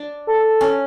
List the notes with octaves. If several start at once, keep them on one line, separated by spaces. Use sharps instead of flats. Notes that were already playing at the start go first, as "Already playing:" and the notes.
Already playing: D4
A4
C#4